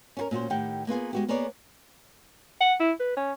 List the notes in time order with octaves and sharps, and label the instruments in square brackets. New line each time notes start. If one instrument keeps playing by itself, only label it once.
[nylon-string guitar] C#4 F#4 A#4
A#2 C#4 F#4 C5
A2 D#3 G4 F#5 G5
A#3 B3 F4 G#4
G#3 F#4 G4
A#3 B3 G#4 A#4 C#5 D5
[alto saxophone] F#5
E4
B4
C#4